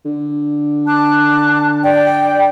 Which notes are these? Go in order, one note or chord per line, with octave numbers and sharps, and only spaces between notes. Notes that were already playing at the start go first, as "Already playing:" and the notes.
D3
A5 D6 F#6
D5 G5